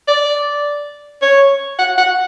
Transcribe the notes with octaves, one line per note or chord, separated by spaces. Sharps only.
D5
C#5
F#5
F#5